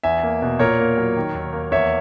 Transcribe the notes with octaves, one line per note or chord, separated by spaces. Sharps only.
E2 E5 G#5
A#3
B2
A#2 A#4 C#5
A#3
F#3
D#3
D#2
A#3
E2 C#5 E5